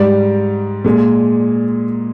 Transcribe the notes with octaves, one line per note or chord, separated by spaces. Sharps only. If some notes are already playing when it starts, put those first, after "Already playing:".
Already playing: G#2 G3 D5
A#2 G#3